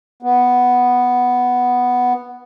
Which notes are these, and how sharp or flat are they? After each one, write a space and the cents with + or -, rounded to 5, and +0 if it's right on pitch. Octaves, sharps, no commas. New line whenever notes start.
B3 +0